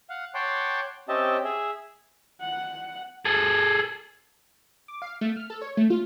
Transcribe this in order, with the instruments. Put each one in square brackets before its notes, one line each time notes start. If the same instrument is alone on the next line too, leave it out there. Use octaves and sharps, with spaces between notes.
[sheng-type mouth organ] F5 F#5
C#5 F#5 G5 A5 C6 D6
C4 C#4 G4 D#5 E5 A5
G#4 E5
[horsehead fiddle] F#5
[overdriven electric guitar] G#4 A4
[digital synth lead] D6
F5
A3
F6
A4
C#5
A3
F4